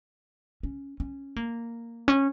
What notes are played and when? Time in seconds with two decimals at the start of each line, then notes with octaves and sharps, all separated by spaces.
0.63 C#4
1.00 C#4
1.36 A#3
2.08 C#4